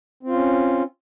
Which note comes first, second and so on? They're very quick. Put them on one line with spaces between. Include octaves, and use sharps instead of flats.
C4 F4 C#4